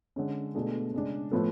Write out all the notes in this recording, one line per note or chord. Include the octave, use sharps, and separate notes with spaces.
D3 G#3 C#4
B2 A3 D4 G#4
C#3 G#3 D4
A2 F3 B3 F4 A4